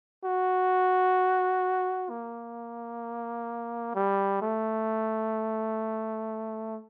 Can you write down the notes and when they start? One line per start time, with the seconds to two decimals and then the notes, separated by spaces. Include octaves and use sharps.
0.25 F#4
2.10 A#3
3.95 G3
4.42 A3